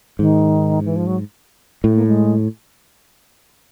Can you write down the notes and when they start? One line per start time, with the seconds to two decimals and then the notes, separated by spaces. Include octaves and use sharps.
0.19 G#2 D#3
0.85 E3
0.96 F3
1.07 F#3
1.84 A2 A3
1.96 A#3
2.07 G#3